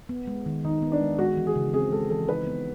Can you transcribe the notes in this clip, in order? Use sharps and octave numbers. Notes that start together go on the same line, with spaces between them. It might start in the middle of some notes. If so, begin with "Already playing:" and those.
B3
G#3
D#3
D#3 D#4
B3
D4
G#3
G#3 F#4
E3
G#4
C#3
C4 G#4
G#3 A4
E3 A4
D#4 B4
B3